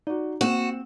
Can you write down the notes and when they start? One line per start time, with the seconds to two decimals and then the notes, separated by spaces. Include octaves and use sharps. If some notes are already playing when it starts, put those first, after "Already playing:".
0.07 D#4 F#4 D5
0.41 A#3 C4 F#4 F#5 E7